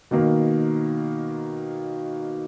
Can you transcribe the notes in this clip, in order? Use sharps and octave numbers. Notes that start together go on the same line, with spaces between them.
B2 D#3 A#3